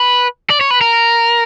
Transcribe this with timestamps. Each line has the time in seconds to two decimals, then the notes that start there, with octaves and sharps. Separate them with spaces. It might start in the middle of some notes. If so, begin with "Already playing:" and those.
Already playing: B4
0.50 D5
0.61 C#5
0.70 B4
0.81 A#4